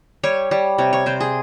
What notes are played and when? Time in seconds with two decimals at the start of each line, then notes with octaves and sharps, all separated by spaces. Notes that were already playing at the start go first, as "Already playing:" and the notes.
0.23 G3 C#5
0.51 G3
0.78 C3 C#5
0.93 C#5
1.06 C3 C5
1.20 G#4